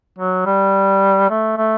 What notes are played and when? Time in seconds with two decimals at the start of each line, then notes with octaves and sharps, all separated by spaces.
0.18 F#3
0.45 G3
1.30 A3
1.57 A3